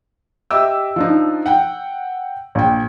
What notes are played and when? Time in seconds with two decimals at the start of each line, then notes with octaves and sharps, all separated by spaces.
0.51 G4 D#5 E5 D6 E6
0.96 F3 D4 D#4
1.46 F#5 G5
2.55 A#1 G5